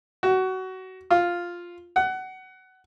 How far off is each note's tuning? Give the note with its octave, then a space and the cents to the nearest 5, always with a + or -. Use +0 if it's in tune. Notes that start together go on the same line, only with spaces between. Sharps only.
F#4 +20
F4 +0
F#5 +20